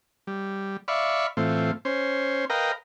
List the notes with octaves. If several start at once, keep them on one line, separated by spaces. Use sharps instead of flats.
G3
D5 E5 F5 B5 C#6
A2 E3 A3 C4 F4
C#4 C5
A#4 B4 D#5 F5 G5 A#5